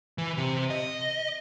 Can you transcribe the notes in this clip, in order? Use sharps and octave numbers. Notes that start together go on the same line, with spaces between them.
E3
C3
D#5